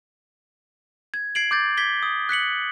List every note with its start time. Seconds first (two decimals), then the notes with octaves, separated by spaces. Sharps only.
1.14 G#6
1.35 G#6 C7 D7 F#7
1.51 D6 G6 A6
1.77 G#6 B6 G7
2.03 D#6
2.29 F#6 B6 C#7 F#7